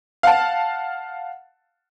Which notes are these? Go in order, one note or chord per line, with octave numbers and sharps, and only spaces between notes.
F5 F#5 A5